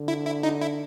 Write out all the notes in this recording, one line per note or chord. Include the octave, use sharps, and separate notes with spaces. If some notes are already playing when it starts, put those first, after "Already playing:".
Already playing: D3
E4
E4
D#4
E4